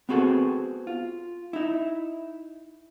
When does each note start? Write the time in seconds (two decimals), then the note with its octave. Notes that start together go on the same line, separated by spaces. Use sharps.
0.09 B3 C4 F#4 G#4 A4
0.87 F4
1.53 D#4 E4